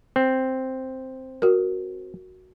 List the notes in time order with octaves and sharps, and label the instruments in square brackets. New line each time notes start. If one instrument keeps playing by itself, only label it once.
[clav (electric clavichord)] C4
[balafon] F#4 A#4